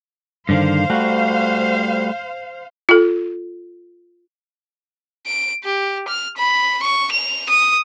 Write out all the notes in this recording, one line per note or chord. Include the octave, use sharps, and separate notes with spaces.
G2 D3 D#3 C5 F5
G3 A3 F#4
F4 A4
D7
G4
F6
B5
C#6
F7
D#6